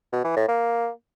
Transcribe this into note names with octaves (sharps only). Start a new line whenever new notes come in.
B2
E3
A2
A#3